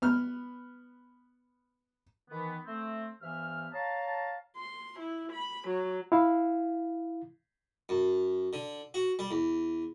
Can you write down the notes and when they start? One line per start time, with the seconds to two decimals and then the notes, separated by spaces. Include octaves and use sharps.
0.02 B3 F6
2.30 D#3 E3 B3
2.66 A3 C4
3.22 G2 E3 B3 C5 E5 F6
3.73 C#5 F5 A5 A#5
4.57 C6
4.99 E4
5.32 B5
5.68 F#3
6.12 E4 F5
7.89 F#2
8.53 D3
8.94 F#4
9.19 G3
9.31 E2